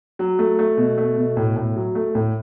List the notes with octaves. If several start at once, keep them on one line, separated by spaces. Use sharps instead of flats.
F#3
A3
A3
B2
A3
B2
A2
A2
F#3
A3
A2